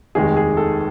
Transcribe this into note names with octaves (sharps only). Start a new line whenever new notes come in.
F1 D#2 D#3 G#3 G#4
G#4
A4